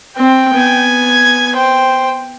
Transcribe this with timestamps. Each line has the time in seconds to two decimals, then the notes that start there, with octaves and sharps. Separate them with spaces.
0.17 C4 G5
0.54 B3 G#5
1.04 G#6
1.56 C5 G5